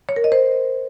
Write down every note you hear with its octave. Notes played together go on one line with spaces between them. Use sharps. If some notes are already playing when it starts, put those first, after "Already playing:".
C#5
A#4
D#5
C5